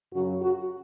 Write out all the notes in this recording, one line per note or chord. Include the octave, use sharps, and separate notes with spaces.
F#2 C#3 F#3 F#4
F#4